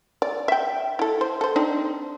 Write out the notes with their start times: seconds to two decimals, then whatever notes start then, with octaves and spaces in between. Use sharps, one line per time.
0.22 D5
0.48 E5 G5
0.99 E4 A4
1.21 C5
1.41 A4 C5
1.56 C4 D4 D#4